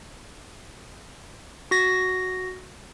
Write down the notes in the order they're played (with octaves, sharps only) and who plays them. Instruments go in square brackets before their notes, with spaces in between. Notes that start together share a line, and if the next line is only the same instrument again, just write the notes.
[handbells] F#4 A#6